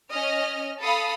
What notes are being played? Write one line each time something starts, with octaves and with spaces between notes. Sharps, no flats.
C#4 D#5 F6
A4 F5 B5 D#6